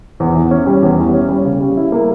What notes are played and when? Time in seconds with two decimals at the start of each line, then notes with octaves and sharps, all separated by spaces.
0.20 E2
0.36 E3
0.51 C#4
0.67 G3
0.82 E2
0.98 E3
1.14 C#4
1.29 G3
1.45 C#3
1.61 G3
1.77 E4
1.92 A#3